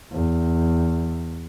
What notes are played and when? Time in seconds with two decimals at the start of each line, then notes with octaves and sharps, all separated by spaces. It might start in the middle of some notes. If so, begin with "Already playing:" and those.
0.12 E2